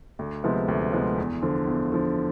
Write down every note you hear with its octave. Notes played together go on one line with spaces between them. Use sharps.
D2
C3 F3 G#3 B3
D2
C3 F3 G#3 B3
E2
D3 F3
E2
D3 F3